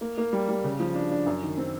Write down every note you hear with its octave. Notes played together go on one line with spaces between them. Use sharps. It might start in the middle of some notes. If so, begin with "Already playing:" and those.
A#3
A#3
G3
G3
C#3
F3
D4
D4
F#2
D#3
C4